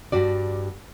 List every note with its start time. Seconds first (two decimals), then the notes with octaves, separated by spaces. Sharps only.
0.12 G2 G3 F#4 D5